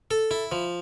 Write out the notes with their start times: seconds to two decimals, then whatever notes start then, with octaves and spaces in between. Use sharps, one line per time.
0.11 A4
0.31 E4
0.52 F3